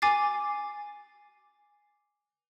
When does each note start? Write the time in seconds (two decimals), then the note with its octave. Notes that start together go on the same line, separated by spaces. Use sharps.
0.02 G#5 D6 A6 C7